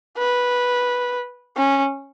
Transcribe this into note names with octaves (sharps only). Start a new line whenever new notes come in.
B4
C#4